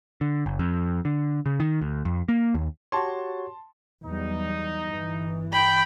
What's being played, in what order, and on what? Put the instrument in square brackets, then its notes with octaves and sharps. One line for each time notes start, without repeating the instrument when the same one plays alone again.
[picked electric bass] D3
F#1
F2
D3
C#3
D#3
D2
F2
A#3
D#2
[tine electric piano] F#4 G4 C#5 [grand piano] A5 C6
[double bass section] E2 F#3 G3 [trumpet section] D#4
[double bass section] G1 E3
[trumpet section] G5 [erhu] B5